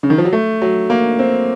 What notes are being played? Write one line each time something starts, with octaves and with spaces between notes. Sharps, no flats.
C#3
D#3
F3
F#3
A3
F#3
A#3
C4